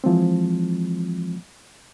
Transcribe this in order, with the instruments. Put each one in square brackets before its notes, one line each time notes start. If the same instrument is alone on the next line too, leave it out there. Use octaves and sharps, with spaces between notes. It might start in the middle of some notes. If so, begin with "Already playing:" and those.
[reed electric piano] E3 F3 G#3 C4